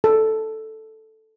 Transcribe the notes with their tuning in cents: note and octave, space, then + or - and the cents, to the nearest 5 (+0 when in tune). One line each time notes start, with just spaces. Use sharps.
A4 +0